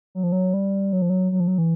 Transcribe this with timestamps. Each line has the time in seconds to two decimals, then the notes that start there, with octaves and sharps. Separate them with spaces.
0.15 F#3
0.23 F3
0.32 F#3
0.54 G3
0.93 F#3
1.02 F3
1.10 F#3
1.32 F#3
1.40 F3
1.48 F#3
1.58 E3